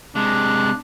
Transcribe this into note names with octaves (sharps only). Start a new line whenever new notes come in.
C3 G#3 D4